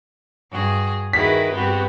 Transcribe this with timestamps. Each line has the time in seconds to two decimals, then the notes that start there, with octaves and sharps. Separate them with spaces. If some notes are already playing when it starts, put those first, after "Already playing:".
0.50 G2 F#4 G#4
1.13 D#3 E4 F#4 G#4 A#4 B4 B6
1.53 G2 B3 C4 F#4 G4